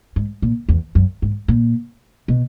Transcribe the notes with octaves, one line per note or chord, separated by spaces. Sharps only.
G#2
A#2
E2
F#2
G#2
A#2
B2